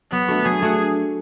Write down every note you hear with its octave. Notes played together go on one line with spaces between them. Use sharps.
F#3 B3
A3 D4 F#4 A4
F#3 G#4
A3 D4 F#4 A4